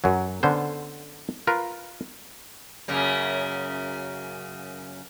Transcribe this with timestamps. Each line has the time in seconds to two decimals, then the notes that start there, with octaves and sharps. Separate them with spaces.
0.04 F#2 F#3
0.43 D3 B3 C#4 C5
1.47 F4 A#4 B4
2.88 F#2 C#3 A#3